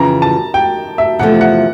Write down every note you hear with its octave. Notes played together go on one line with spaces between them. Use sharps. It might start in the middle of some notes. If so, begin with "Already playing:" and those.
Already playing: F2 C#3 E3 A#5
A5
G5
E5
E2 C3 F3 A3 F#5
F#5